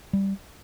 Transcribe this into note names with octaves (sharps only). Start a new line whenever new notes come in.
G3